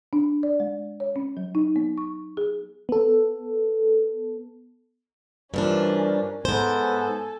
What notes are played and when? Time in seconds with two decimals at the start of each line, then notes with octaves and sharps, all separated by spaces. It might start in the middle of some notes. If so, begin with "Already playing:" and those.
0.13 D4
0.43 D5
0.60 G#3
1.00 C#5
1.16 C#4
1.37 F#3
1.55 D#4
1.76 B3
1.98 C#6
2.37 G#4
2.89 B3 A4
5.54 G2 E3 F3 C#4 D4 A#4
6.45 G#2 B3 A4 C5 G#5